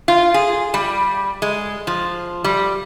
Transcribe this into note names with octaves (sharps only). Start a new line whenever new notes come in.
F4
G#4
G3
G#3
F3
G3